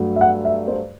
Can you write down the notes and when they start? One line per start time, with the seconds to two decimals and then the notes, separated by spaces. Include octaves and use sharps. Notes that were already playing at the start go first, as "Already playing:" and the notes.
Already playing: G2 F#3 A3
0.16 E5
0.21 F#5
0.45 E5
0.68 C5